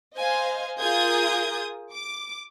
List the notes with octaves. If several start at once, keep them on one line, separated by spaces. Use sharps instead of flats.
C5 D#5 F5 G#5
F4 G#4 A#4 D#6 G6 G#6
D6